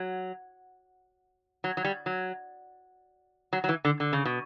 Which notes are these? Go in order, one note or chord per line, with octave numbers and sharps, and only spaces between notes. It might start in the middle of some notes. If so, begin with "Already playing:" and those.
Already playing: F#3
F#3
F#3
G3
F#3
F#3
F#3
E3
D3
D3
C#3
B2